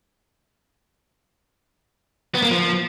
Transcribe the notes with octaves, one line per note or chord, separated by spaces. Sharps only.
B3
A#3
F3